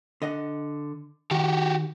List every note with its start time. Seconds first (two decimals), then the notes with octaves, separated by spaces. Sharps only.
0.22 D3 D#5 F#5
1.31 D#3 F#4 G4